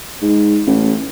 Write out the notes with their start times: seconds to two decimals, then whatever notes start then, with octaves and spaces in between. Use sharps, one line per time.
0.22 G#2
0.67 A1